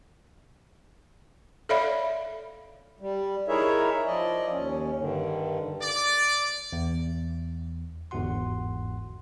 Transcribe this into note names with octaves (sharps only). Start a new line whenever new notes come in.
A4 C#5 D5 E5 F5 B5
G3
D#4 E4 G#4 A#4 C#5 E5
F3 D5 D#5
D#2 C#4
G2 D3 D#3
D5
E2
G1 E2 G#2 F#4 F#5 C6